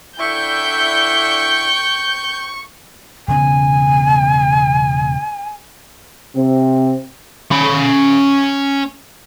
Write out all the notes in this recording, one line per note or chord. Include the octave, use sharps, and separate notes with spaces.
D3 D4 E4 G5 C#6 G6
E1 C#3 B3 G#5
C3 C4
C#4 B5